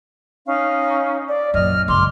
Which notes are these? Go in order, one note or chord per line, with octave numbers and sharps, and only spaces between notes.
C#4 D#4 F5
D5
F#2 A#2 D#5 F6
F#1 G#3 C6 D6 F6